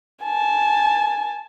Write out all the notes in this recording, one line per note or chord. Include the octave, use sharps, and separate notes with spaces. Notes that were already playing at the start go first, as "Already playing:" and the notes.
G#5 A5